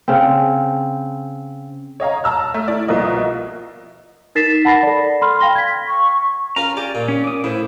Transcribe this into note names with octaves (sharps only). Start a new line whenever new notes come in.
C#3 C4
C#5 D#5 F5 A#5
A5 A#5 E6 F6
A3
E4 D5
C2 B2 F3 A#3 F4 D#5
D#4 A#4 A6 B6 C7 E7
F#5 A5 B5 A6 A#6 C7
A4 D5
B5 C6 F6
F5 G5 A#6 G7
G#6 B6
C#6
C#4 F4 A#4 A#5
G4 D5 G#5
A#2
C#4
D6 D#6
A2 E4 C5